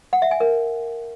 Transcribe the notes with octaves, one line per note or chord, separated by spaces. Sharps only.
F#5
E5
G#5
A#4